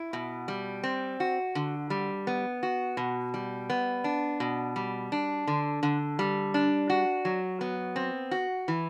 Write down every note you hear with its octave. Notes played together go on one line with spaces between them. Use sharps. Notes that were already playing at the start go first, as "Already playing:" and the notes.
Already playing: E4
B2
G3
C4
F#4
D3
G3
B3
F#4
B2
G3
B3
D4
B2
G3
D4
D3
D3
G3
D4
F#4
F#3
B3
C4
F#4
E3